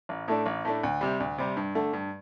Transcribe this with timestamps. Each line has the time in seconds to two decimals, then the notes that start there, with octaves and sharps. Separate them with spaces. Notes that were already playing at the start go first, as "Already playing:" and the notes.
0.09 A1
0.28 A2 A3 D4
0.46 A1
0.65 A2 A3 D4
0.84 D2
1.01 C3 G3
1.20 D2
1.38 C3 G3
1.57 G2
1.75 D3 A3
1.93 G2